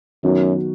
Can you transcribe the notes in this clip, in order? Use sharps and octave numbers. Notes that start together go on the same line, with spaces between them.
F#2 D#3 F#3 B3 D#4 F#4